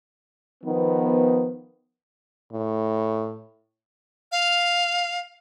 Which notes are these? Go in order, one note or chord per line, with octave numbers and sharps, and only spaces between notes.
D#3 F3 B3
A2
F5